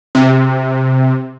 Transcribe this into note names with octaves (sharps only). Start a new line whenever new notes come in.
C3